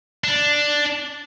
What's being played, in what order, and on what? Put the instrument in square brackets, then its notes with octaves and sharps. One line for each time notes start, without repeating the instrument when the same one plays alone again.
[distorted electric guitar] D4